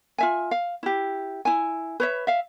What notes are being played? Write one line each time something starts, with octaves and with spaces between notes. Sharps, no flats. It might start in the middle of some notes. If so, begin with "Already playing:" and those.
F4 E5 G#5
F5
E4 G4
E4 G#5
B4 C#5 E5
E5 F5